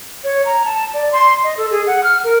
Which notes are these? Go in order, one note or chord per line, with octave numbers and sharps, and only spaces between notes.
C#5
A#5
A5
D5
C6
D#5
A4
G#4
F#5
F6
A#4